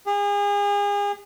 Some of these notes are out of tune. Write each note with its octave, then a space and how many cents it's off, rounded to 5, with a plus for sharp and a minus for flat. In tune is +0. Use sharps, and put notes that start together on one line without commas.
G#4 -35